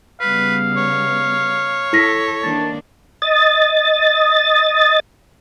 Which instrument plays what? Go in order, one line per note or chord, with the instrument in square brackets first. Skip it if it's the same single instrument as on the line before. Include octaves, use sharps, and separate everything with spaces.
[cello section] C#3 G3 B3 [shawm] B4 [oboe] F5
[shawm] C#5
[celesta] E4 A#6 B6 [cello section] A4
[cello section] D#3 A#3 D4 [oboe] A5
[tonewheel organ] D#5 A6